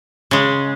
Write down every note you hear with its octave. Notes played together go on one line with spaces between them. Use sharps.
C#3 G#3